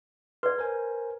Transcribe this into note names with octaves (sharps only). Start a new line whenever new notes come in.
B4 D5 C6
A#4 C5 G#5